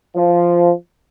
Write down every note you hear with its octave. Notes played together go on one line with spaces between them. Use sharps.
F3